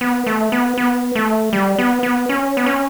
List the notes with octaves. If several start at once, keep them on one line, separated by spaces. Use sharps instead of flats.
B3
A3
B3
B3
A3
G3
B3
B3
C#4
B3
C#4